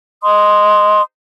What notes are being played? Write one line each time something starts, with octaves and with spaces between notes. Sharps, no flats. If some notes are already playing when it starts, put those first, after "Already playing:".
D#5 C6 D#6